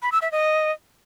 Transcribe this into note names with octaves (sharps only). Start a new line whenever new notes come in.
B5
E6
E5
D#5